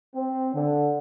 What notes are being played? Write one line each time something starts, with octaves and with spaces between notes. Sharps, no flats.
C4
D3